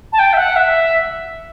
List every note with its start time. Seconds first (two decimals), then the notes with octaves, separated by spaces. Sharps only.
0.12 A5
0.19 G5
0.33 E5
0.37 F#5
0.56 E5